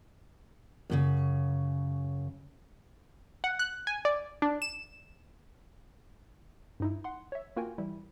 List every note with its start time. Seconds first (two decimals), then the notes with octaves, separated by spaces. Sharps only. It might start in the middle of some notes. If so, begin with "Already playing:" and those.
0.90 F#2 A#2 C#3
3.44 F#5
3.59 F#6
3.87 G#5
4.05 D5
4.42 D4
4.62 E7
6.80 G2 D#4 E4
7.04 F#5 C6
7.32 C#5 E5
7.56 A#3 F4 F#4 A#4 G5 G#5
7.78 E3 G3 E4